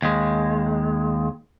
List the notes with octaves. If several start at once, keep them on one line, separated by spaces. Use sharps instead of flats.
D#2 G#3